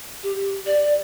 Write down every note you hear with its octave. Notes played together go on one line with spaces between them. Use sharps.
G4
D5